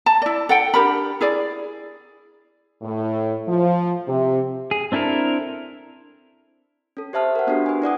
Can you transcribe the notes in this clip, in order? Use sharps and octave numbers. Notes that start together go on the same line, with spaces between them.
A5
E4 D5
A4 F#5 G5
D4 G4 A#4 B5
E4 G#4 D5
A2
F3
C3
G#4
C4 D4 E4 A4 A#4
C#4 A4
G4 C5 E5 A5 F6
A#4 F#5
B3 D4 F#4 G4 A4
B4 G#5
E4 D5 F#5 D#6